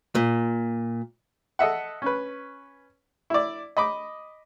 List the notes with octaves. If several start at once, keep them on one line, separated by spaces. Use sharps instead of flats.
A#2
A4 D#5 E5 F#5
C#4 B4
E4 D5
D#5 B5 D6